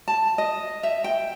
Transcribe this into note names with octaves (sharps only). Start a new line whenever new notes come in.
A5
D#5
E5
G5